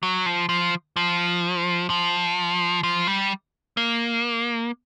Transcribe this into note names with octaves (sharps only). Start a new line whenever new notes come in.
F#3
F3
F3
F3
F3
F3
G3
A#3